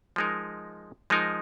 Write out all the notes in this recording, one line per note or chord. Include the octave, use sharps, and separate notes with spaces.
F3 G#3 D#4 A#4
F3 G#3 D#4 A#4